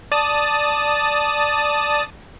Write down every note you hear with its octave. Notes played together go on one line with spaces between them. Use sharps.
D5 A5 D#6